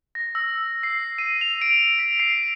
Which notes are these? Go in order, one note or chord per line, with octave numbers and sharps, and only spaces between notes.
A#6
E6
C7
D#7
F7
D7
B6
C7